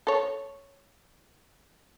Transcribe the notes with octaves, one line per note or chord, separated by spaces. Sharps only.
A4 C#5